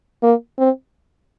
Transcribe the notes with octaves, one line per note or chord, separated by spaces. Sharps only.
A#3
C4